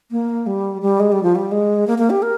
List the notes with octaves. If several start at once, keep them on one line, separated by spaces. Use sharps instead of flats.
A#3
G3
G3
G#3
G3
F3
G3
G#3
A#3
A#3
G4
A#4